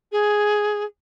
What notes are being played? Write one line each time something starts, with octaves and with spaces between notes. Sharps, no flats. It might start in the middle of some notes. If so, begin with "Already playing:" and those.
G#4